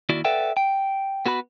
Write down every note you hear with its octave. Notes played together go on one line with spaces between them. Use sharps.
D#2 E4 F#4 D5
A4 B4 D5 E5 F#5 G5
G5
B3 F#4 B4 B5